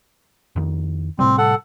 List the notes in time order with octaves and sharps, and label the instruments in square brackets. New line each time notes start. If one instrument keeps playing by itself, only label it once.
[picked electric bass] F2 D#3
[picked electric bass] A2 C3 G3 [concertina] C4
[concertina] A4 F#5